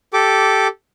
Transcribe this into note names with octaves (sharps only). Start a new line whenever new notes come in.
G4 A4 D6